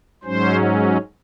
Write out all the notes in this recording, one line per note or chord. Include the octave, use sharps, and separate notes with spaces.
G#2 F#3 C#4 C5